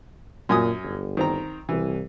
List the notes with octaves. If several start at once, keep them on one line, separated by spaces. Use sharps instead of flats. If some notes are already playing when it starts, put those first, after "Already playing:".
F#2 A#2 G#5 D#6
G1
D#3 C4 A#5
C2 E3